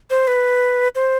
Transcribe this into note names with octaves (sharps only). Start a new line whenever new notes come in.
C5
B4
C5